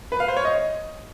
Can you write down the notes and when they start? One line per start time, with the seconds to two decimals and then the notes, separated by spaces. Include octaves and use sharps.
0.12 B4
0.20 F5
0.28 C5
0.37 C#5
0.45 D#5